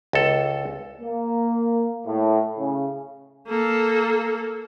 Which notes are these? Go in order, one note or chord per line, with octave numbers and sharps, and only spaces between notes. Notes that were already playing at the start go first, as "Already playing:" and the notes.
C#2 A4
A#3
A2
C#3
A#3 A4